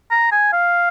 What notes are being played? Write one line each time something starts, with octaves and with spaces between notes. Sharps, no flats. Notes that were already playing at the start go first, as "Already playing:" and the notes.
A#5
G#5
F5